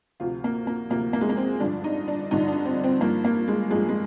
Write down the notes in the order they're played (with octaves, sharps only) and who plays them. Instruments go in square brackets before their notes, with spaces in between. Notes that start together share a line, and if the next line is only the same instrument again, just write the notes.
[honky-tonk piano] D2 C3 F3 F4
A#3
A#3
D2 C3 F3 A#3
A#3
G#3
A#3
C4
G2 D3 F3 D4
D#4
D4
G2 D3 F3 D#4
D4
C4
C4
G2 F3 A#3
A#3
G#3
G2 F3 G#3
G#3